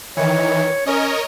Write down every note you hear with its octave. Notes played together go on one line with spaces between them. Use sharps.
D#3 E3 C#5
C#4 A#4 C#5 D#5